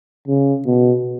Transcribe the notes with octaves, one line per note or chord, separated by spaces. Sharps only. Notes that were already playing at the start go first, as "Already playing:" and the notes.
C#3
B2